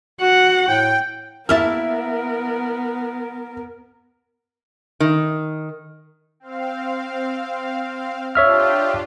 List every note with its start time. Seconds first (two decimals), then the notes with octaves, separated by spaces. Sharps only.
0.21 F#4 F#5
0.68 A2 G5
1.49 A#3 B3 E4 A#4 E5 A5 F6
5.00 D#3
6.40 C4 F5
8.35 D4 F4 G4 C#5 E5 F6